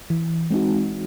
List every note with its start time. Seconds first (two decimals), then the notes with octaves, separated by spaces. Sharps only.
0.10 E3
0.50 G#3 C4 D#4 F#4